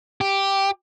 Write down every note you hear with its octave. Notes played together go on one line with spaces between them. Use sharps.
G4